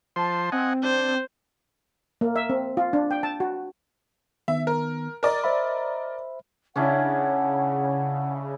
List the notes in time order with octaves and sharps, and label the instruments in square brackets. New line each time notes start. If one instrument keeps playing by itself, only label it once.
[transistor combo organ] F3 C5 C6 [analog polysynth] A5
[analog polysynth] C4 [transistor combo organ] D#5 F#5 G#5
[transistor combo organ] D4 [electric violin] C5
[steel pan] A#3
E5
C4
F4
D4
G5
A5
F#4
[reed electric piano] D#3 B3 [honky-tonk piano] E5
[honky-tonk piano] A#4
A#4 D5 D#5
[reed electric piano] C5 E5 B5
[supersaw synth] C#3 [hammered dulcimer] C#4 D4 E4 [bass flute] F#5